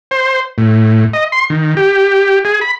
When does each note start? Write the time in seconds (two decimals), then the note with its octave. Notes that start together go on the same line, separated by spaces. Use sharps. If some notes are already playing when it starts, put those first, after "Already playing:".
0.11 C5
0.58 A2
1.13 D#5
1.32 C6
1.50 D#3
1.77 G4
2.45 G#4
2.61 B5